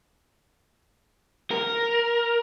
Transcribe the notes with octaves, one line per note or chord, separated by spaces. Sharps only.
A#4